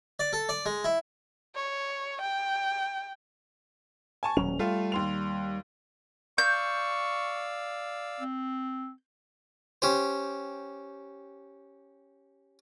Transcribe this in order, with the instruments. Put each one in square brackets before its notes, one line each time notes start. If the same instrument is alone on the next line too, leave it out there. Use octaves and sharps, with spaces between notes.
[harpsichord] D5
A4
D5
G#3
E4
[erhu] C#5
G5
[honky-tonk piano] G#5 A5 C#6
[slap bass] D#1 F#3 C#4 [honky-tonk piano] F7
[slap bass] G3 [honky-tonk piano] A3 F4
[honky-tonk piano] D#2 C6 F7
[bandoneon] D5 F5 E6 [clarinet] C#6 [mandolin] G6
[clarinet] C4
[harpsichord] C#4 G4 C5